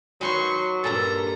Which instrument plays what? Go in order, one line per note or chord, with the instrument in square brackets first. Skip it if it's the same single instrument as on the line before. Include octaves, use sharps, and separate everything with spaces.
[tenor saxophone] F#3 [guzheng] D#4 B4 C#5 [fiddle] C6 C#6
[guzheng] G2 A#2 [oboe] A4 [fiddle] A#5